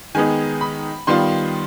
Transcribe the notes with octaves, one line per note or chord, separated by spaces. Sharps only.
D#3 G#3 B3 D#4 G#5
B5
D#3 G3 B3 F4 C6